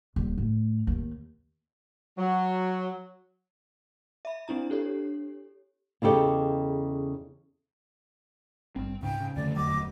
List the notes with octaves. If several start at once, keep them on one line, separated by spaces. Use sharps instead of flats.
D#1
A2
D#2
F#3
E5 B5
C4 D4 E4 A#5
D4 G4 A4 C#5
E2 C#3 E4 G4 A4 D#5
G#1 G2 C4
C#2 G#2 C#3 G5
C#3
F2 D3 A3 D5
D1 E2 F#3 D#5 D6